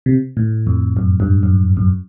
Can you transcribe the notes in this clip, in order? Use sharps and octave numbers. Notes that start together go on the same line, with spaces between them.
C3
A2
F2
F#2
G2
F#2
F#2